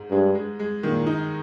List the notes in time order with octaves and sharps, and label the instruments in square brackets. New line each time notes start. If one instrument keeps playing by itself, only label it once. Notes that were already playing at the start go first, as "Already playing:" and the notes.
Already playing: [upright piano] G#2 G#3
[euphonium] G2 [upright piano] G#3
[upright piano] G#3
G#3
[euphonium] A#2 [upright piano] D#3
[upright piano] D#4